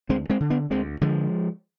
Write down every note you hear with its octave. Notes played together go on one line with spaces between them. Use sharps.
D2 G#3 C4
G#3 C4
D3
B3 D4
D2 G#3 C4
D3 F3 G#3